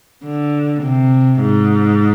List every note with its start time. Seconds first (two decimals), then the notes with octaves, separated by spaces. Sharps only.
0.24 D3
0.83 C3
1.41 G#2